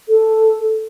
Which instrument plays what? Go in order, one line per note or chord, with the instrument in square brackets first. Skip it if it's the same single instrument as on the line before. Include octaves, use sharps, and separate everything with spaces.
[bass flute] A4